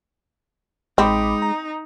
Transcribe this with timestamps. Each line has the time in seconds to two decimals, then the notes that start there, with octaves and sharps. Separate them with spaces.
0.98 A1 G#3 C4 D#4 B5 D6
1.42 A#5